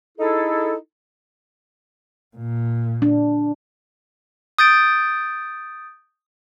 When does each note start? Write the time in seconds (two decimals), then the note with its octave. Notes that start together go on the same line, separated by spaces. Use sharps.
0.18 D#4 E4 G#4 A4
2.36 A#2
3.02 D4
4.59 D#6 G6 A6 D7